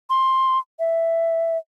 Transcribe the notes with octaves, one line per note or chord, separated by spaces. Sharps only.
C6
E5